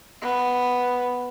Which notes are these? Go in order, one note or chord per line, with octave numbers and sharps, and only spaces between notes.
B3